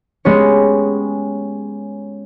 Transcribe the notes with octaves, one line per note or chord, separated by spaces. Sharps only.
G#3 B3 C#4 G4 C#5